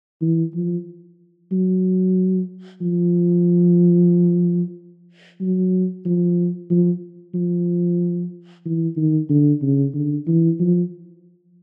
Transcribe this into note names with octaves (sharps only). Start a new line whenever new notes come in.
E3
F3
F#3
F3
F#3
F3
F3
F3
E3
D#3
D3
C#3
D3
E3
F3